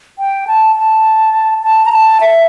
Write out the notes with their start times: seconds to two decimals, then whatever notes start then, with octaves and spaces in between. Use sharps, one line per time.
0.19 G5
0.47 A5
0.76 A5
1.63 A5
1.86 A#5
1.92 A5
2.21 E5